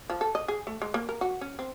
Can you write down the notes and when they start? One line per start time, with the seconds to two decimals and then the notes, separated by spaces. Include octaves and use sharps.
0.10 F3
0.21 A4
0.35 D#5
0.48 G#4
0.67 A3
0.82 G#3
0.94 A#3
1.09 A#4
1.21 F#4
1.41 C#4
1.59 C4